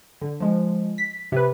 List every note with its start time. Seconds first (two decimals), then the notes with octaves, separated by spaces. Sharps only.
0.21 D3
0.40 F3 G#3
0.98 B6
1.32 C3 B4